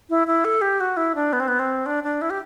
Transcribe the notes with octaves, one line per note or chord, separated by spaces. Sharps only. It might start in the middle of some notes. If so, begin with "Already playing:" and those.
E4
E4
A4
G4
F#4
E4
D4
B3
C4
B3
C4
D4
D4
E4
G4